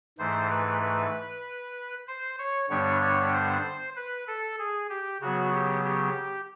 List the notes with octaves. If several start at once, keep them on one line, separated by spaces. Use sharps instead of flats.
G#2 E3 A3 C5
B4
B4
C5
C#5
G2 D3 G3 B3 D4 C#5
C#5
C5
B4
A4
G#4
G4
C#3 F#3 B3 F#4
G4
G4